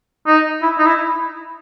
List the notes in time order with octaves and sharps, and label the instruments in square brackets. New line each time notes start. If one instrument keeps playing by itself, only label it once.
[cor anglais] D#4
E4
D#4
E4